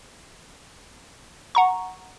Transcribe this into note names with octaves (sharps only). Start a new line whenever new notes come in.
F#5 A#5 C#6